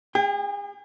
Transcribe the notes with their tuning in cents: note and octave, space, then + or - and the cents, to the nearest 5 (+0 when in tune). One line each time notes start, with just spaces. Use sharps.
G#4 -35 G5 +20